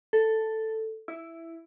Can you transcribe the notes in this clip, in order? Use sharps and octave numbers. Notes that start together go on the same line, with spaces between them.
A4
E4